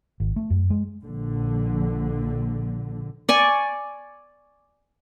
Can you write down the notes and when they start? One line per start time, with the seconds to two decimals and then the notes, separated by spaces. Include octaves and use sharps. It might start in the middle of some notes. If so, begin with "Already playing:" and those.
0.20 G#1
0.36 A3
0.50 F#2
0.70 G#3
1.02 A#1 D3
3.29 D5 G#5 C#6